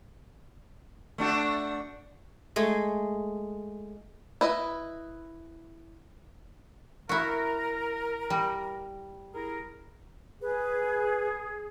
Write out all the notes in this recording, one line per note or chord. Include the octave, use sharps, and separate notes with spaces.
A3 D4 F#4
G#3 A3 G#4
E4 B4 D#5
E4 F#4 A#4
G3
E4 G#4 A#4
G#4 B4